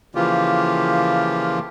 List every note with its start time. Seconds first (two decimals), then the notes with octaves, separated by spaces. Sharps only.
0.15 C#3 E3 F3 A#3 F4 G4